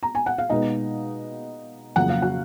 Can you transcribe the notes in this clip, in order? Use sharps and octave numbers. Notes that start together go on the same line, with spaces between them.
A#5
G#5
F#5
F5
B2 G#3 B3 D#4 D#5
F2 C#3 F#3 A#3 F#5
F5
F#4 F#5